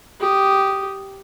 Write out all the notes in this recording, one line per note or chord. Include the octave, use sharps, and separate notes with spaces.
G4 D#6